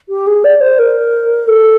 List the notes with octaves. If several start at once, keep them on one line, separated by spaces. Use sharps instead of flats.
G4
G#4
D5
C5
A#4
A4